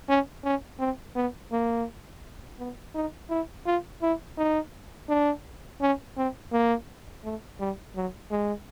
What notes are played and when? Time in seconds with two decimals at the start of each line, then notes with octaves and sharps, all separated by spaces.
0.09 C#4
0.44 C#4
0.80 C4
1.16 B3
1.52 A#3
2.59 B3
2.95 D#4
3.30 E4
3.66 F4
4.03 E4
4.38 D#4
5.09 D4
5.81 C#4
6.17 C4
6.52 A#3
7.24 A3
7.60 G3
7.96 F#3
8.31 G#3